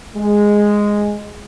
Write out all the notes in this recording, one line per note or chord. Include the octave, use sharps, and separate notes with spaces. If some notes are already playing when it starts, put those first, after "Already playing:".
G#3